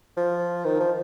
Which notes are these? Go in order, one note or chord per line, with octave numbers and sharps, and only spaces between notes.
F3
D#3
F3